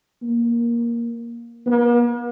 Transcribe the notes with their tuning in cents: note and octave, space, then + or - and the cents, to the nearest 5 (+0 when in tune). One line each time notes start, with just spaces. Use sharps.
A#3 +10
A#3 +45